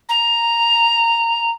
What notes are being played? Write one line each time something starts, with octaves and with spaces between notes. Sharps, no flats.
A#5